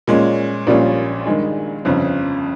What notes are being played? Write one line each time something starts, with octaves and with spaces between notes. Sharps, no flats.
A#2 G#3 C#4
A#1 A#2 G3 C#4 F4
G2 D#3 G#3 D#4 G#4
G1 F2 C#3